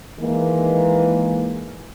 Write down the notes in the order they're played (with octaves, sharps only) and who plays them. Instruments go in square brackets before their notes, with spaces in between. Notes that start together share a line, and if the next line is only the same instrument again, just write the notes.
[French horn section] D#3 E3 G#3 A#3